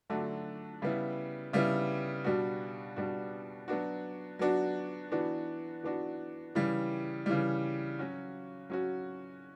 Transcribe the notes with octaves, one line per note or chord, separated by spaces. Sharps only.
D3 F#3 A3 D4 F#4
C#3 G3 B3 E4
C#3 G3 B3 E4
B2 G3 D4 F#4
B2 G3 D4 F#4
F#3 B3 D4 F#4
F#3 B3 D4 F#4
E3 B3 D4 F#4
E3 B3 D4 F#4
C#3 E3 G3
C#3 E3 G3
F#3 C#4 F#4
F#3 C#4 F#4